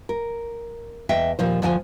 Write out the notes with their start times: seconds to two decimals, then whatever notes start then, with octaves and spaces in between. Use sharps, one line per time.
0.09 A#4
1.09 E2 D#5 E5 G5
1.39 D#2 A#2 F3 C5
1.62 D2 F3 G5 G#5